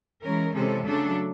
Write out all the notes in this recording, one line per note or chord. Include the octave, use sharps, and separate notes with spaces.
E3 G#3 C#4 A#4
C3 E3 G#3 C#4 A4
C#3 F#3 A3 D4 A4